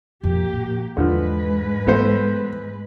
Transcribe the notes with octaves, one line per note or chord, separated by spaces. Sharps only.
F2 B2 A#3 G4
A#2 F3
E2 G#2 D3 F3 G#3 B4
E3 A3 B3 C5